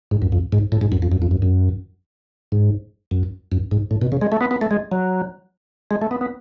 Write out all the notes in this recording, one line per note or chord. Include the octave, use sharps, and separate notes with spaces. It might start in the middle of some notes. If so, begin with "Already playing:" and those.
G#2
F#2
F2
G#2
A2
G#2
F#2
F2
F#2
F2
F#2
F#2
G#2
F#2
F#2
G#2
A2
B2
C#3
G#3
A3
B3
B3
A3
G#3
F#3
G#3
A3
B3
B3